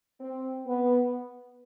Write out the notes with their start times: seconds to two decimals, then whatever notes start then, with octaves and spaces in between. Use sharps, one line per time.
0.20 C4
0.66 B3